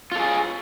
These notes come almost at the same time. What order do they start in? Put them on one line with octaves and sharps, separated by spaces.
F4 A4 G#4